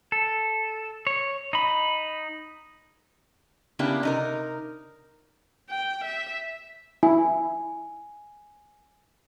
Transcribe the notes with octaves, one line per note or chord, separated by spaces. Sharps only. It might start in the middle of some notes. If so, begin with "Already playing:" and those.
A4
C#5
D#4 B5
C#3 A#3 B3 D4 E4 G4
C3 D#4 A#4
G5
E5
E4 G#5